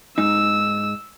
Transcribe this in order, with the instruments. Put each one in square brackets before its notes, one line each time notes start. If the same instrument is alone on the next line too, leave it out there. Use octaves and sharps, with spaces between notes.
[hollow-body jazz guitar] G#2 D#4 [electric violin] E6